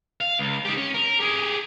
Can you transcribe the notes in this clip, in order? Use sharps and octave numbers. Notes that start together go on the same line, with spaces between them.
F5
C#2
D#4 G4
C#4
A#4
G4 G#4